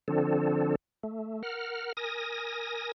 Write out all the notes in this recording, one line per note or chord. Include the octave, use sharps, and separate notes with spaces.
D3 F3 C4 D4 A4
A3
A#4 F#5 F6
A#4 G#5 D#6 A#6